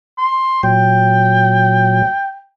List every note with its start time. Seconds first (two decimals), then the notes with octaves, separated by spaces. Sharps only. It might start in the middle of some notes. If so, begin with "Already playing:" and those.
0.18 C6
0.63 A#2 F#3 G5